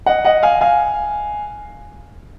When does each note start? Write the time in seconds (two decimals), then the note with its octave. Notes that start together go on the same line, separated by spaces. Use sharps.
0.06 D#5 F#5
0.25 D#5 F#5
0.43 F5 G#5
0.61 F5 G#5